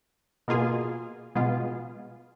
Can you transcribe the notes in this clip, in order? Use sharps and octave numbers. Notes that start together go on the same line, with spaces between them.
B2 A#3 F4 G#4
B2 G#3 B3 F4